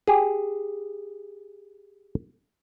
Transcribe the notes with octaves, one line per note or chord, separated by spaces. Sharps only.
G4 G#4